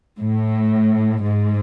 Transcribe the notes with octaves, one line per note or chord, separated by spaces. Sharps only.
A2
G#2